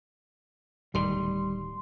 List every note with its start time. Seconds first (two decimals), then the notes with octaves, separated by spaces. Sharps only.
0.95 D1 D#3 G3 C6